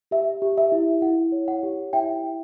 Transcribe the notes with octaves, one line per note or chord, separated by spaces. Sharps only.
G4 E5
G4
E5
E4
E4 F#5
C#5
F#5
G4
E4 E5 G5
E4